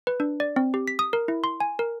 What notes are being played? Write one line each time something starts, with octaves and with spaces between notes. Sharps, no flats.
B4
D4
D5
C4
G4
B6
D#6
A#4
E4
C6
G#5
A#4